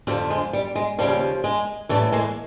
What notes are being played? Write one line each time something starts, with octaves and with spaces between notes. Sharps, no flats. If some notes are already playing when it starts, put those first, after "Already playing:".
F2 D3 F3 G3
G#3
G3
G#3
D#2 C#3 F3 G3
G#3
A2 E3 G3 A3
G#3 A#3